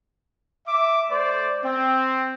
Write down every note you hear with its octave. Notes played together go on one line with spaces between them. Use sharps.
E5 D6
A3 C5 D5
C4